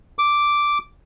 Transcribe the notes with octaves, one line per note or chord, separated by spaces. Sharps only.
D6